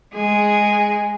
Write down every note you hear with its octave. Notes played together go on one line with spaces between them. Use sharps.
G#3 G#4